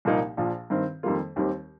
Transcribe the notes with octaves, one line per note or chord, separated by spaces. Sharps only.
C2 A#2 F3 A#3 D#4
A#1 A#2 F3
G2 D#3 C4
F2 D#3 G3 A#3 F4
D#2 D#3 G3 C4 G4